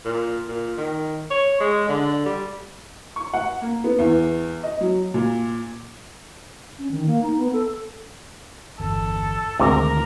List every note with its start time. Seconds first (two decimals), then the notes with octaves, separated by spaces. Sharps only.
0.05 A#2
0.48 A#2
0.77 D#3
1.30 C#5
1.60 G#3
1.88 D3
2.25 G3
3.16 C#6
3.34 F#5
3.61 A#3
3.84 B3
3.99 E2
4.63 D#5
4.81 F#3
5.14 A#2
6.79 C#4
6.91 D#3
7.06 A#3
7.22 D#4
7.38 B3
7.53 A4
8.80 G1 E2 A4
9.59 G#1 D2 C3 D#3 A#4